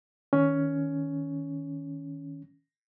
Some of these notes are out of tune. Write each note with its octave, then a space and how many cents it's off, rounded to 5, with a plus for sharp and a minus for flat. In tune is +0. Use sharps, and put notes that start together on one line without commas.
D#3 +15 C#4 +10